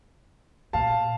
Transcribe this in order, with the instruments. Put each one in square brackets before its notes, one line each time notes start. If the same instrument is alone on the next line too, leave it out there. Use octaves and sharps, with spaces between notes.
[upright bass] A#2 [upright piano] F5 A5